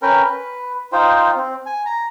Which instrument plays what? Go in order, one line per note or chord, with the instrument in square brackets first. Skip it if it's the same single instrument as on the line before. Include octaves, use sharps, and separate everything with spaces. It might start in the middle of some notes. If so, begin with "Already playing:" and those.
[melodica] C#4 A#4 B4 G5
B4
D#4 F4 C5 G5
C4
G#5
A#5